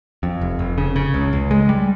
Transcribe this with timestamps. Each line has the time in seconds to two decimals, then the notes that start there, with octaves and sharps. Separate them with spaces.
0.23 F2
0.41 F1
0.59 F1
0.78 C#3
0.96 C#3
1.14 C#2
1.33 C#2
1.51 G#3
1.69 G3